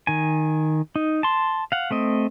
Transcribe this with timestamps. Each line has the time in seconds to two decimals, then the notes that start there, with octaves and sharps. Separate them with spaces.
0.07 D#3 G#5
0.96 D#4
1.23 A5 C6
1.72 F5 F#5
1.91 A3 C4 D#5